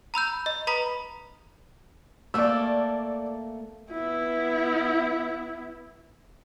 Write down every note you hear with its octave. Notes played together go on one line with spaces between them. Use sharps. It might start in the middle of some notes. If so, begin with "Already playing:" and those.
A#5 B5 E6 G6
D#5
B4 A#5 B5 D#6 B6
A3 A#3 A4 D5 E6
B3 E4